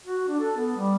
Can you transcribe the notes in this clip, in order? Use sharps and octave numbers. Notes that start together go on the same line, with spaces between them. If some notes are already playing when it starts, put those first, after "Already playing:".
F#4
D4
A4
B3
G3